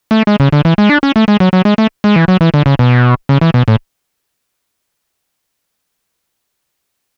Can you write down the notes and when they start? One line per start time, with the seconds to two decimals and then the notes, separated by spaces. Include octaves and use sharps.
0.11 A3
0.27 G#3
0.40 C#3
0.52 D3
0.65 E3
0.78 G#3
0.89 D4
1.03 C#4
1.16 A3
1.28 G#3
1.40 F#3
1.53 F#3
1.65 G#3
1.78 A3
2.04 G#3
2.16 E3
2.28 F#3
2.41 E3
2.54 D3
2.66 C#3
2.79 B2
3.29 C#3
3.41 E3
3.54 B2
3.68 A2